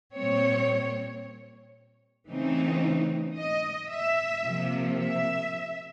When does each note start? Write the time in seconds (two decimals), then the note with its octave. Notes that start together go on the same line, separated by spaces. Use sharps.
0.15 A#2 G3 C4 C#5
2.29 C#3 E3 A3 C4 D#4
3.37 D#5
3.90 E5
4.45 C3 F3 A#3
4.99 E5